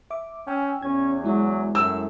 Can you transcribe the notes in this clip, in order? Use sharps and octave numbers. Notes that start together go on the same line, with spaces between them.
E5 D6
C#4 G5 G#5 E6
E2 C#4 G#6
F#3 G#3 E4
F#2 A2 E6